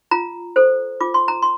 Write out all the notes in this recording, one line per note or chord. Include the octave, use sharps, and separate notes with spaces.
F4 A#5
A4 C5
F4 D6
C6
A#5
C6